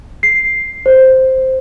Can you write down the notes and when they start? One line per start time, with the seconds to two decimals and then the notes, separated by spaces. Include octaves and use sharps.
0.23 C7
0.86 C5